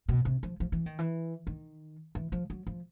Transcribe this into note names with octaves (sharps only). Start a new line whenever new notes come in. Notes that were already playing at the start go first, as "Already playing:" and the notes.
B2
C3
F3
F3
E3
D#3
E3
D#3
E3
F3
F#3
F3